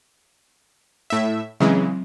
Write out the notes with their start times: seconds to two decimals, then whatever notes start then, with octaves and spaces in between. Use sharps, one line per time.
1.10 A2 E5
1.60 C#3 E3 F#3 G#3 C4